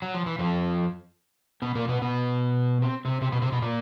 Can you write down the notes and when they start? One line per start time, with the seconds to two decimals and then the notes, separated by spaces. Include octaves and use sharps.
0.02 F#3
0.14 F3
0.26 E3
0.39 F2 F3
1.62 B2 B3
1.75 A#2 A#3
1.88 B2 B3
2.02 B2 B3
2.82 C4
3.05 C3 C4
3.21 C3 C4
3.32 B2 B3
3.42 C3 C4
3.52 B2 B3
3.62 A#2 A#3